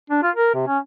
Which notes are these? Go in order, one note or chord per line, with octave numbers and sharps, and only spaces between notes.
D4
F4
A#4
C3
C#4